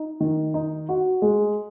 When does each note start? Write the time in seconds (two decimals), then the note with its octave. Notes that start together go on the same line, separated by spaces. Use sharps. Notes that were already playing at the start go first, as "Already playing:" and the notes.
Already playing: D#4
0.20 D#3
0.54 D#4
0.89 F#4
1.22 G#3